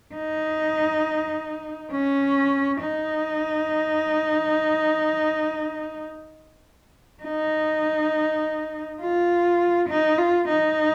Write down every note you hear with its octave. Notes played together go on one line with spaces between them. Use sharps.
D#4
C#4
D#4
D#4
F4
D#4
F4
D#4